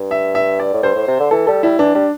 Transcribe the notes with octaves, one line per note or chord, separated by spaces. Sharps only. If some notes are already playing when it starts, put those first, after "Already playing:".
Already playing: G2
E5
E5
D5
A2
G2 C5
A2
C3
D3
E3 A4
G3 A4
G3 E4
E3 D4
G3 D4